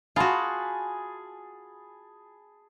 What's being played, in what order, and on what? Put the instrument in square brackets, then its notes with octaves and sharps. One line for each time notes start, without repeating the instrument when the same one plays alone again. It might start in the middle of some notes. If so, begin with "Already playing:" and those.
[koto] F4 F#4 [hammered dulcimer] G#4 A5 B5